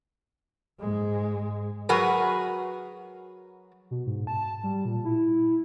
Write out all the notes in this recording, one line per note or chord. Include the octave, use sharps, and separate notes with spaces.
G#2 G#3
F#3 F#4 G#4 A#4 B4
B2
G#2
A5
G3
A#2
E4